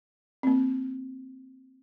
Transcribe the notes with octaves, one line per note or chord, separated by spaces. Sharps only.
A#3 C4